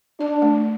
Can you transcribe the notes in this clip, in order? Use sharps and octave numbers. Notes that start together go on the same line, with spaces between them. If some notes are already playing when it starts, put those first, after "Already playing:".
D4 D5
A3